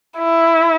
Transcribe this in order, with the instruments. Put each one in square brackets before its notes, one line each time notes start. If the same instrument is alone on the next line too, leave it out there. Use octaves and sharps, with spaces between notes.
[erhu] E4